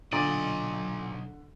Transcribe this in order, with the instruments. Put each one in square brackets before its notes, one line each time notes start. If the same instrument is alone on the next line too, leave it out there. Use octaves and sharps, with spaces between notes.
[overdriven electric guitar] B1 D#5 [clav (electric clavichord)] A#2 D5 [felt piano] D3